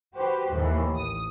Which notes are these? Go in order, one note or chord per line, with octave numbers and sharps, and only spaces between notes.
F#4 G4 B4 C5
D#2 A2 E3
A1 D#6